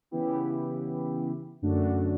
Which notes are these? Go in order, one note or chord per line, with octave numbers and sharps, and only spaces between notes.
C#3 E3 B3 E4 G4
F#2 D3 A3 D4 F#4